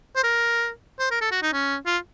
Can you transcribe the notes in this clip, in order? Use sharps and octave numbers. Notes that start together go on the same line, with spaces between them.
C5
A#4
C5
A#4
A4
F#4
D#4
C#4
F4